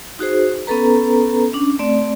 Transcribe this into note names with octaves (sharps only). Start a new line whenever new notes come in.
D#4 F#4 G#4 C5
B3 C#4 A4 B4 A#5
C#4 D4
A3 C4 D5